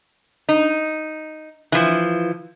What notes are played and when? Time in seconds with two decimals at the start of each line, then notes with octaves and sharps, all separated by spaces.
0.49 D#4
1.72 E3 F3